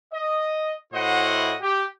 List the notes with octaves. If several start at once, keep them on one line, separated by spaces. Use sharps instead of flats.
D#5
A2 E4 F#4 C5 D#5 F#5
G4